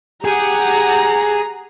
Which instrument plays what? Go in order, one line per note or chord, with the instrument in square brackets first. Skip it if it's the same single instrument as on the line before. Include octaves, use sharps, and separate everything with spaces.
[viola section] G4 F#5 [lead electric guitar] G#4 [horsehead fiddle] A#5